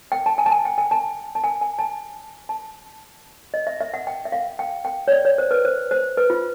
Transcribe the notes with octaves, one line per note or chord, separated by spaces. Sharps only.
G5
A5
G#5
A5
G#5
G5
G#5
A5
A5
G#5
G#5
A5
A5
D#5
E5
E5
F#5
G5
E5
F5
G5
G5
C#5
D5
C#5
C5
B4
C5
C5
B4
F4